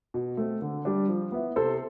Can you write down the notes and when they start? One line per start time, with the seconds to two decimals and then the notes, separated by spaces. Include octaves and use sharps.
0.14 B2
0.37 A3 C4
0.62 D3
0.85 G3 D4
1.08 F3
1.32 B3 E4
1.56 C3 A4 C5